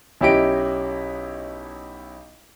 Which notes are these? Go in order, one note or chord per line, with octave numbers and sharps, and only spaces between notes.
B1 C#4 E4 G4 D#5 D7